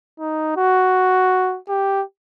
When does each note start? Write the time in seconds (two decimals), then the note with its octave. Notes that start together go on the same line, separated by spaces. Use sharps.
0.20 D#4
0.57 F#4
1.69 G4